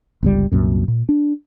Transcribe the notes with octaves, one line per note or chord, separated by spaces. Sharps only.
G1 C#2 G3
C2 F#2 A#2
A#2
D4